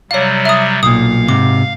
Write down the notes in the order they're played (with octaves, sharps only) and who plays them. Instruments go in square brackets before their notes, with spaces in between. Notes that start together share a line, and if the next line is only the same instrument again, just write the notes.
[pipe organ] C3 F#3 G3 [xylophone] C#5 F5
[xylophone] E5 D#6
[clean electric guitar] B1 A#2 [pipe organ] F5 [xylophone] D#6
[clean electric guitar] G#2 C3 [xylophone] D6